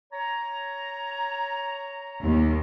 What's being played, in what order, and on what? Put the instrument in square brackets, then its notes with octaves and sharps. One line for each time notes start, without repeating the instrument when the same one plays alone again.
[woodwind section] C#5 A#5
[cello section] D#2